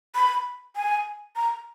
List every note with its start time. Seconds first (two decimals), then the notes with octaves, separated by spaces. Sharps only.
0.15 B5
0.76 G#5
1.36 A#5